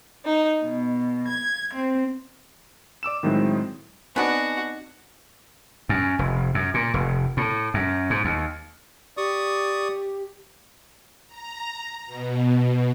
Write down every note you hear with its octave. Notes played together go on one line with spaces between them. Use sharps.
D#4
B2
G#6
C4
D5 D6 E6 E7
A2 D#3 F#3 G#3 C4 E4
B3 C4 D4 D#4 F#4 D#5 G#5
F#2
F1
F#2
A#2
F1
A2
F#2
G#2
D#2
G4 D5 C#6 D#6
A#5
B2